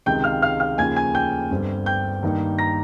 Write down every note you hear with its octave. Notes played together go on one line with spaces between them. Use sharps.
C#2 C3 D#3 G#3 G5 G6
F5 F6
F5 F6
F5 F6
D#2 C#3 F3 G#5 G#6
G#5 G#6
G5 G6
G1 G2 G3 C4
G5 G6
G2 D#3 A#3 D#4
A#5 A#6